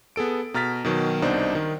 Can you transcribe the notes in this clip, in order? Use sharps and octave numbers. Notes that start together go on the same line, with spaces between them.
B3 G#4 A4 D7
B2 A#5 F6 A6 B6
B2 D#3 F#3
C2 B2 D4 D#4 C5
D#3